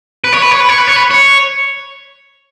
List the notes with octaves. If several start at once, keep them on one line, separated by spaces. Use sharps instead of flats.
B4
C#5
B4
C#5
B4
C#5
B4
C#5
B4
C#5